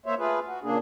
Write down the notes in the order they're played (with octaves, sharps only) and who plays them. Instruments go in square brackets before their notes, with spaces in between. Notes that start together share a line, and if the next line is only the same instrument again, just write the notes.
[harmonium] A#3 C5 C#5 E5
A3 F4 G#4 B4
F#4
A#2 C#3 A#3 D4 G#4